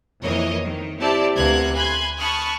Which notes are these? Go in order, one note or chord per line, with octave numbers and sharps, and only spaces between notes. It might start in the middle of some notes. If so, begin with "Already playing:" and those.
F2 E3 A#3 C#5 D#5
D#3
C4 E4 G4 D5 A5
D2 C3 A#3 B3 F#6 G#6
G#5 B5 C6 F#6 G#6
A5 B5 C#6 D#6 F6 F#6